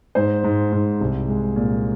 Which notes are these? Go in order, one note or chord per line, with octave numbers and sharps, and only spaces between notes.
G#2 C5
G#2
G#2
C2
G#3
A#2